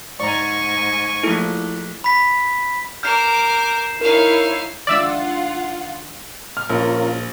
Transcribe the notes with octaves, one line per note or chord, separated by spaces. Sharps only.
G#2 D5 G#5 A#5 C#6
A#1 A3 E4
B5 B6
A#4 D6 F6 G6 C7 E7
D#4 E4 A#4 C#5 F5
D#3 G#3 D4 F4 D5 E5 F#5 E6
F6
A#1 C#4 F4 A#4